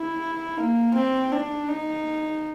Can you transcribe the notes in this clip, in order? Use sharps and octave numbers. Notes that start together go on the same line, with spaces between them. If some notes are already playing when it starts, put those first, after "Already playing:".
Already playing: E4
A#3
C4
D4
D#4